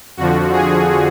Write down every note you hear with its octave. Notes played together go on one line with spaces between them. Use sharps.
F2 D3 F3 F#4
G#4